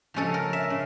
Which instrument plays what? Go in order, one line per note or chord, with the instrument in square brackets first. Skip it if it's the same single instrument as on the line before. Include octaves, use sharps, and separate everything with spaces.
[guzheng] C#3 F3 G#3 C#4 A4
A#4
E5
C#3